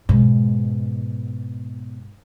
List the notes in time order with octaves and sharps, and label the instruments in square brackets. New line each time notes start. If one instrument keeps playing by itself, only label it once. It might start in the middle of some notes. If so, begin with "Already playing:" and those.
[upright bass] G#2 B2